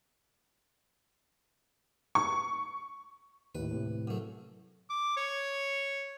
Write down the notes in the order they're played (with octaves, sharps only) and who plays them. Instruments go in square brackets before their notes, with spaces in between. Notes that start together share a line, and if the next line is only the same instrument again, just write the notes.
[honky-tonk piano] C#6
[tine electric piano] D#2 A2 [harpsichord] B4
[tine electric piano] A2 C3
[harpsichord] F#2 A3
[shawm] D6
C#5